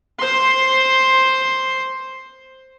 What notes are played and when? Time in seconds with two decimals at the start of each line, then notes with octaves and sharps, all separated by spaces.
0.20 C5 C6